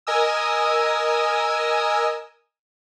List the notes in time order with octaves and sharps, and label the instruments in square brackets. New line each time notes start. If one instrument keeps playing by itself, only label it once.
[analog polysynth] A#4 D#5 G#5 D#6 E6